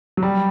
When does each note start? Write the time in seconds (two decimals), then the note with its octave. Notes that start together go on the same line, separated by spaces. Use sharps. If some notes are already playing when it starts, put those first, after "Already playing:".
0.17 F#3
0.23 G3